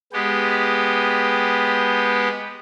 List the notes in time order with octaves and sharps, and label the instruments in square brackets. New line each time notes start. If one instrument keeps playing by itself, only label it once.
[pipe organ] G#3 B3 G4